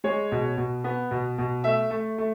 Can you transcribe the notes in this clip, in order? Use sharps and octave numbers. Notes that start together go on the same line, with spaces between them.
G#3 C#5
B2
B2
B3
B2
B2
A3 E5
A3
A3